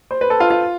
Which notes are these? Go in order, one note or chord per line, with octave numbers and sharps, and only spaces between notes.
C5
B4
A4
F4
F4